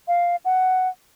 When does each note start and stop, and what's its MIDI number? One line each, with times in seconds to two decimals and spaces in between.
0.08 0.36 77
0.45 0.89 78